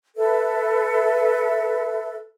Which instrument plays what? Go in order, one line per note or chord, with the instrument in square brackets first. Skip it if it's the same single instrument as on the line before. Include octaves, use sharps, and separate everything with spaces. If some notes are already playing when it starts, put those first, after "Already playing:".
[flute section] A4 B4 E5